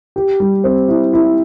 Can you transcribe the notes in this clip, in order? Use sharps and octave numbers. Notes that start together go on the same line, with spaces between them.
G4
G3
C4
E4
E4